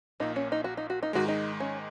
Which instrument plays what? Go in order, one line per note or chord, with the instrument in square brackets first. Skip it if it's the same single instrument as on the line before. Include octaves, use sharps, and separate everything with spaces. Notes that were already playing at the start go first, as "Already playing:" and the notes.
[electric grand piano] A#1 A#2 A#3 [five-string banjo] D#4
[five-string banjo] C#4
D#4
F#4
D#4
F#4
D#4
[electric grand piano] G#2 D#3 G#3 [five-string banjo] F#4
[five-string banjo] D#4
C#4